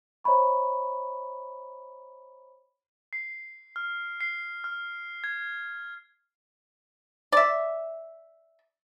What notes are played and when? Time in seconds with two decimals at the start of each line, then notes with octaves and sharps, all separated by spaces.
0.24 C5 C#5 D#5 A#5 B5 C#6
3.13 C7
3.76 F6
4.21 C7
4.64 F6
5.24 G#6
7.32 D5 E5